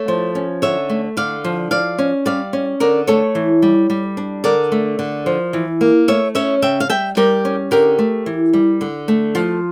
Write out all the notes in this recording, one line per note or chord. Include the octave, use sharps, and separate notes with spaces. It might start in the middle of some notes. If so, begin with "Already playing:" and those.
Already playing: A3 C#5
F3
C#4
D3 C#5 E5
A3
D3 D5 F5
F3
F3 D5 F5
C#4
G3 D5 F5
C#4
D3 A#4 D5
A3 A4 C#5
E3
G3
G3
D4
D3 A#4 D5
A3
D3
F3
E3
A#3
A3 C#5 E5
C#4 C#5 E5
C#3 E5 G5
F5
G3 E5 G5
G3 G4 A#4
C#4
D3 G4 A#4
A3
E3
G3
D3
A3
F3 F4